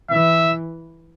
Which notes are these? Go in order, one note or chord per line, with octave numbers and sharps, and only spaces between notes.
E3 E5